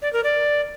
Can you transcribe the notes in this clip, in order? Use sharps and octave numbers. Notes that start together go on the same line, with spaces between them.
D5
A#4
D5